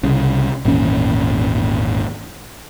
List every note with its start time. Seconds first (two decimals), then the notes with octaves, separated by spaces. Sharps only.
0.03 C2 C#3
0.65 G#1 E2 A#2 C#4